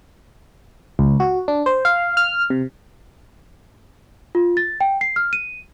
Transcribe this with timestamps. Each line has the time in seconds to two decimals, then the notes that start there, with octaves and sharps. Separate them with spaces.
0.99 C#2
1.20 F#4
1.48 D4
1.66 C5
1.85 F5
2.17 F6
2.50 C3
4.35 F4
4.57 A6
4.81 G5
5.01 C7
5.16 F6
5.33 D#7